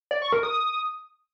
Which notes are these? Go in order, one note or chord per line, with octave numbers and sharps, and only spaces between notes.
D5
C#6
A#4
D#6